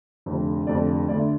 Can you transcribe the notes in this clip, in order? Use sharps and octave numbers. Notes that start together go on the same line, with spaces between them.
F1 F2 D3
F1 F2 D3 D5
D2 D3 A3 D5